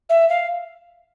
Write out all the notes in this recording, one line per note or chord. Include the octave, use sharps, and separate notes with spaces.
E5
F5